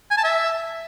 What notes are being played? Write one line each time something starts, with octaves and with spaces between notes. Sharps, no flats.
G#5
A5
E5